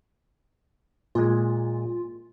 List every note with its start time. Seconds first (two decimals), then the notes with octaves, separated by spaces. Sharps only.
1.15 A#2 G#3 F4